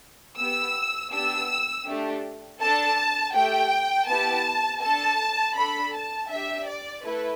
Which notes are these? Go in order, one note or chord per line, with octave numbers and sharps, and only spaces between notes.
B3 G4 E6
B3 D4 G4 E6
A3 D4 G4
D4 A4 A5
A3 G4 G5
B3 E4 G4 A5
D4 A4 A5
D4 A4 B5
A5
D4 G4 E5
D5
A3 E4 A4 B4